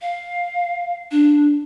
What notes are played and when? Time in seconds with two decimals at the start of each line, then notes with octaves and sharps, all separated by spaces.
0.02 F5
1.11 D4